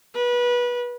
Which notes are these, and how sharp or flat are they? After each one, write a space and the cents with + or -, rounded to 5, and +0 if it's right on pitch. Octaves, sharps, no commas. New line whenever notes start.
B4 -25